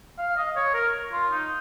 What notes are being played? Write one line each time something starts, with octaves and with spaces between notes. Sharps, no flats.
F5
D#5
C#5
A#4
F4
D#4